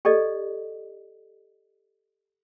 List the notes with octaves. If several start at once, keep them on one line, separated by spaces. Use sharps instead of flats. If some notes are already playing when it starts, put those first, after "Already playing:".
G4 A4 D5 D#5